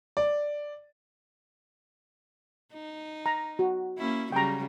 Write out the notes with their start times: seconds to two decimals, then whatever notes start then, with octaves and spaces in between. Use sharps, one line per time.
0.17 D5
2.73 D#4
3.26 A#5
3.59 F#4
3.98 A#3 C#4 E4
4.32 C#3 F#3 G3 G5 A#5